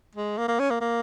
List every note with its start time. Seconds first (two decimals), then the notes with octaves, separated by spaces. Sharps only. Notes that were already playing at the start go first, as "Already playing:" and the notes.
0.15 G#3
0.38 A#3
0.48 A#3
0.59 C#4
0.70 A#3
0.81 A#3